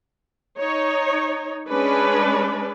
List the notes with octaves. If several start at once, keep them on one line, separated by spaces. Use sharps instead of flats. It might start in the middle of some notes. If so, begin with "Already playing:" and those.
D#4 C#5
G#3 C#4 D4 B4 D5